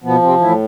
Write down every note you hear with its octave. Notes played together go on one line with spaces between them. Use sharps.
B2 F3 B3
C3 C4
A2 E3 E4